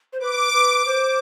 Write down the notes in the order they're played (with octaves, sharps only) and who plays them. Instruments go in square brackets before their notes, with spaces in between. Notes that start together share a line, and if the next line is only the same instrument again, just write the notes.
[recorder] C5
[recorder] B4 [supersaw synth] D6
[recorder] B4
C5